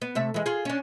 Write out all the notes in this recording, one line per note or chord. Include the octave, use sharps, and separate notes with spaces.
B3
C3 A3 E5
E3 G#3
F4 G#4
C#4 D4